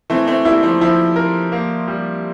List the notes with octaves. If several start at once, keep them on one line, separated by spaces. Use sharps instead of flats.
E3 A3 C4
A3 C4
G3 A#3 E4
F3 A3
F3 A3 E4
A#4
A#3
G3